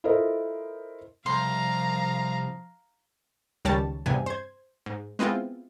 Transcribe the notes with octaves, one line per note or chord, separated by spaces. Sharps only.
E4 F4 A4 A#4 C5 D#5
C2 F3 F5 A#5 C6
C#2 D#3 G3 C#5 A5 A6
E2 G2 C3 G#5
C5 G#6
G#2
G#3 B3 C4 E4 F4